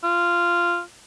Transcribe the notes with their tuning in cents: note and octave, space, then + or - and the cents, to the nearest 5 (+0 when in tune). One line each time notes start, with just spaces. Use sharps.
F4 -10